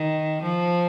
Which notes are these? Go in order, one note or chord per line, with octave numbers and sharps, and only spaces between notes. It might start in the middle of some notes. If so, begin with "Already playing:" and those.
Already playing: D#3
F3